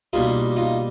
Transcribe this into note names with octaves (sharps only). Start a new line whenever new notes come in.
B2 G3 A#3 D#4 F4
D#4 F4